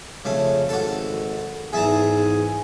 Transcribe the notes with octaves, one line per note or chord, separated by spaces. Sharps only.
F2 C#3 A3
G#1 F#4 A4
E2 G#2 G#4 E5 A5 A#5